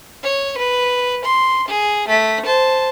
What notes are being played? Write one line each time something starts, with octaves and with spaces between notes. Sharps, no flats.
C#5
B4
C6
G#4
A3 B6
C5 A5